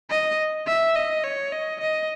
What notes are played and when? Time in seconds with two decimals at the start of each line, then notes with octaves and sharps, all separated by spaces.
0.10 D#5
0.67 E5
0.96 D#5
1.24 C#5
1.52 D#5
1.81 D#5